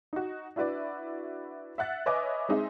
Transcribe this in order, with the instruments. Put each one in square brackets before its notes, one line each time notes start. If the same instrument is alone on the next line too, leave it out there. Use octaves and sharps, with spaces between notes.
[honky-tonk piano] D#4 F#4
D4 E4 F#4 B4 D5
E5 F#5 F#6 A6
B4 C#5 D#5 E5 G#5 D6
G#3 C4 D#4 G#4 E5